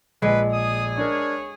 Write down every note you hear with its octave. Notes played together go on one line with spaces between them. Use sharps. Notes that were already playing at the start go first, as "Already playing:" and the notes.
A#1 G#3 B4
G#4 D#6
D4 A#4 C#5